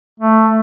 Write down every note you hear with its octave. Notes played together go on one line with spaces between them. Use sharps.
A3